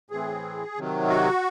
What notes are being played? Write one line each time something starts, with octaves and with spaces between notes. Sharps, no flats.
A2 E3 C4 G#4
C3 D#3 F#3
F#4